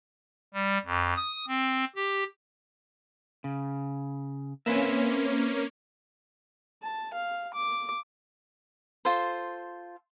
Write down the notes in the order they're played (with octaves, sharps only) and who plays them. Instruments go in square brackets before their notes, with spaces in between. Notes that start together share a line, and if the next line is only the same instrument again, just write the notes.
[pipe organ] G3
F2
D#6
C4
G4
[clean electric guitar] C#3
[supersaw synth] A#3 C#4 [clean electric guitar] C4 B4 E5
[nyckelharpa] A5
F5
D6
[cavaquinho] F4 A4 C5